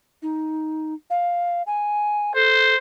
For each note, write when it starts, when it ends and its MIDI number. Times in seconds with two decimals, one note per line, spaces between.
0.22 0.94 63
1.10 1.62 77
1.67 2.35 80
2.35 2.75 69
2.35 2.77 72